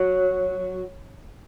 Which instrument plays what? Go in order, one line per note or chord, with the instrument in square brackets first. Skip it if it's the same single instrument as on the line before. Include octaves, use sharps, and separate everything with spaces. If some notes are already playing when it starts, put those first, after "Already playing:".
Already playing: [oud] F#3